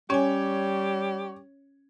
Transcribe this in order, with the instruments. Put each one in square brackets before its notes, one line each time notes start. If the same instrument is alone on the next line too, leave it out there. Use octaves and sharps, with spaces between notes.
[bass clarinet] G3 [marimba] C#4 G#5 [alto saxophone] G4 [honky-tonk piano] C#5